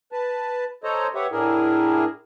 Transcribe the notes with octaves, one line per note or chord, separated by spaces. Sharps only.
B4 A5
A4 C5 C#5 D#5 A#5
G4 B4 C#5 E5 F#5
A2 D4 E4 G#4 A#4